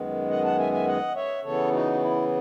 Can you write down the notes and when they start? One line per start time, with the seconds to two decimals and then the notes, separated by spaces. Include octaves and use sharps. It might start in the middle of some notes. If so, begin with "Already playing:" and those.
Already playing: F#2 D#3 G#3 B3
0.30 D#5 F#5
0.44 F#5 A5
0.59 E5 G#5
0.72 E5 G#5
0.87 D#5 F#5
1.15 C#5 E5
1.43 C#3 E3 B3 A4 C#5
1.72 D#4 F#4
1.93 F#4
2.00 E4